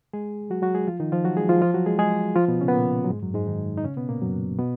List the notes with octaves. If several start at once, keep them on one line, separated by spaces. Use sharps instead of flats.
G#3 G#4
F#3 F#4
F#3 F#4
G#3 G#4
F3 F4
D#3 D#4
F3 F4
F#3 F#4
G#3 G#4
F3 F4
F3 F4
F#3 F#4
G#3 G#4
G#3 G#4
F3 F4
B2 B3
C#3 C#4
B3
A#2 A#3
F#3
G#2 G#3
F#2 F#3
G#2 G#3
D#3 D#4
D#4
C#3 C#4
B2 B3
A#2 A#3
F#2 F#3
B2 B3